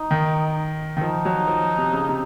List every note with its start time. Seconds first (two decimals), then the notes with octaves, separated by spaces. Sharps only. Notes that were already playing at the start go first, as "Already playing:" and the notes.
Already playing: D#4
0.11 D#3
0.97 D#3
1.01 F3 D#4
1.25 F#3
1.48 F3
1.78 C3
1.93 C#3
2.09 C3